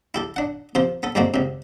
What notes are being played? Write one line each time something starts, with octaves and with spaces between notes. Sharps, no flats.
E4 G4 A4
D4 F#5
C3 F3 C5
B3 A4
G2 D3 G#3 A#3 C4 F#4
C#2 C3